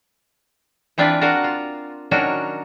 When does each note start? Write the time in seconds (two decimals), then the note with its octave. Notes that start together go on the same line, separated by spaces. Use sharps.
0.98 E3 C4 D4 F4 B4 D5
1.21 D4 F#4 A#4 F5 F#5
1.44 F4
2.11 D#3 F#3 C#4 D4 F#4 A#4